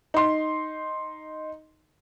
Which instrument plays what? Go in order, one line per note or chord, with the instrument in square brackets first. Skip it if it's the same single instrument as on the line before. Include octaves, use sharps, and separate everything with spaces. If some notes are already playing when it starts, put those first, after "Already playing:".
[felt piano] D#4 C6